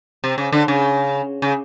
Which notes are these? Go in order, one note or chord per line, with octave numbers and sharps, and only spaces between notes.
C3
C#3
D3
C#3
C#3